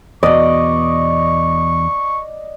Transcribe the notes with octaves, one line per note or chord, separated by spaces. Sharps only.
E2 B2 D5 D#5 C#6